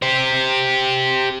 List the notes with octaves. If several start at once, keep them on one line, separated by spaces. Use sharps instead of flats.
G4 C5